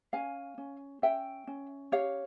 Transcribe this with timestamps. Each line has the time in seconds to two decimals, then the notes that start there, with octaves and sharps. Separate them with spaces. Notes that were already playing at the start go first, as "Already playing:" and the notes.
0.13 C#4 F5 G#5
0.58 C#4
1.02 C#4 E5 G5
1.47 C#4
1.92 G4 C#5 F5